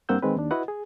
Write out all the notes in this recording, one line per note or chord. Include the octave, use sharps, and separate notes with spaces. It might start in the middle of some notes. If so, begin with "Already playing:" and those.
G2 A#3 C4 F#5 E6 G6
D#3 G#3 C4 B4
D#2 D4
E4 F#4 B4 D#5 F#5
G#4